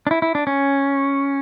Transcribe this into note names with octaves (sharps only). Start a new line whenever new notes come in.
D4
E4
E4
D4
C#4